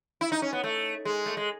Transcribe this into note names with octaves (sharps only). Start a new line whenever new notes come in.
E4
D#4
C#4
B3
A3
G#3
A3
G#3